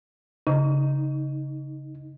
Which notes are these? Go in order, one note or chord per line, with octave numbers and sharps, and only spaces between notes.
C#3 D#4